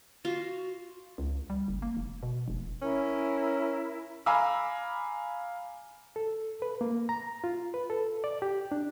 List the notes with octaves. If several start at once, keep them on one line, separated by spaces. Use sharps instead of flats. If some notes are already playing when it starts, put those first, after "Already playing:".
F4 F#4
C#2
G3
F#1
A#3
F1
B2
F1
C#4 E4 A#4
F5 G#5 A#5 B5 D6 E6
A4
B4
A#3
A#5
F4
B4
A4
D5
G4
D4